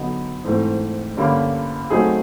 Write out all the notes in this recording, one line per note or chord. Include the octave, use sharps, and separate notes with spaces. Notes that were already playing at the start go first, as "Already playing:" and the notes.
Already playing: D3 F#3 B3 D#4
G#2 E3 A3 C4
G2 D3 G3 A#3 C#4
F#3 A3 C4 D#4 G#4